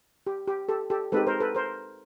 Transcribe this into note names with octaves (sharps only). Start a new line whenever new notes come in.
G4
G4
G4 A4
G4 A4
G#3 C4 D#4 G4 A4 B4
A#4 C5
A4 B4
A#4 C5